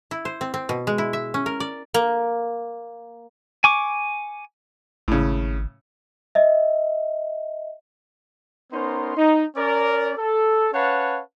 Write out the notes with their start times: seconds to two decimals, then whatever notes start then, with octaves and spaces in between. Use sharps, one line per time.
0.11 E4
0.25 C5
0.41 C4
0.54 C4
0.69 B2
0.87 G#3
0.98 E4
1.13 E5
1.34 C#4
1.46 A#4
1.60 D5
1.94 A#3
3.64 G#5 C#6 D6
5.08 G#1 A2 C#3
6.35 D#5 E5
8.72 B3 C#4 D#4 A#4 C5 C6
9.17 D#4
9.56 C#4 A#4 D5
10.17 A4
10.73 C#4 B4 C#5 F5 F#5 A5